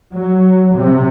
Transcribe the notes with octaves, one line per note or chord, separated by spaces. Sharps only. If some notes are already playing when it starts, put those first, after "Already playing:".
F#3
C3